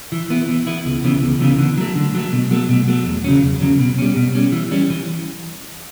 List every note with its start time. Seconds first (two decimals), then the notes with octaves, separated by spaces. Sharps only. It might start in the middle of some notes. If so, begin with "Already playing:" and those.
0.12 E3
0.30 B3 E4
0.49 E3
0.67 B3 E4
0.85 C#2
1.04 C#3 E3 B3
1.22 C#2
1.41 C#3 E3 B3
1.59 D3
1.77 F#3 A3
1.96 D3
2.15 F#3 A3
2.32 B2
2.51 F#3 A3
2.69 B2
2.88 F#3 A3
3.06 E2
3.24 C#3 F#3 C#4
3.42 E2
3.61 C#3 F#3 C#4
3.79 B2
3.98 G3 C#4
4.16 B2
4.35 G3 C#4
4.52 E3
4.71 G3 C#4
4.90 E3